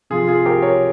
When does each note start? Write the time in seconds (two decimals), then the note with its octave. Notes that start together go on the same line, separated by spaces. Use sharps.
0.10 C3 F3 F4 G#4
0.27 F4 G#4
0.46 G4 A#4
0.62 A#4 C#5